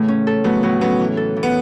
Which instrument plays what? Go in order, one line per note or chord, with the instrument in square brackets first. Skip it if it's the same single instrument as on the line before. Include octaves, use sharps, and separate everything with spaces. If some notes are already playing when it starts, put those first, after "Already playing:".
Already playing: [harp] A2 C#3 E3 A3
C#4
A4
[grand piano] F#3 B3 [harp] A3
[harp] A2 [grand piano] F#3 B3
[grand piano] F#3 B3 [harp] C#4
[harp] E3
A4
E3
[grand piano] B3